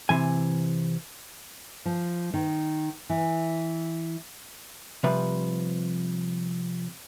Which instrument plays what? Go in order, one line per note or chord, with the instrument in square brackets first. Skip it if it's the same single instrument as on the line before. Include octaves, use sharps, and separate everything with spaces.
[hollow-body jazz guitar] C3 E3 G#5
[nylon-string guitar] F3
D#3
E3
[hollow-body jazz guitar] C3 F3 G3 B4